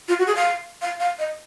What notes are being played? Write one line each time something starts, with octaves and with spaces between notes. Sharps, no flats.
F4
F#4
G#4
F5
F5
F5
D#5